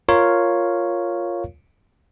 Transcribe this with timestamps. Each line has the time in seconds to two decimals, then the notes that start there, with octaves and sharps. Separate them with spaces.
0.09 F4 A#4 C#5 F5